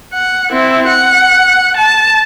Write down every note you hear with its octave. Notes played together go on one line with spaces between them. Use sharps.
F#5
C4 E4
F#5
A5